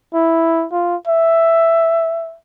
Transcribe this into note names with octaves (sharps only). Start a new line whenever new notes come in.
E4
F4
E5